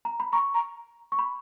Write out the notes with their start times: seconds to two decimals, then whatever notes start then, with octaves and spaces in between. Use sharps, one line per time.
0.05 A#5
0.20 B5
0.32 A#5 C#6
0.54 A#5
1.12 C#6
1.19 B5